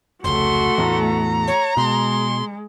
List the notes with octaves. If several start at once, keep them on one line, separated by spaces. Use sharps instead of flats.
F1 C#2 A3 F#4 C6
E2 A2 A#5
C#5
B2 G#3 C6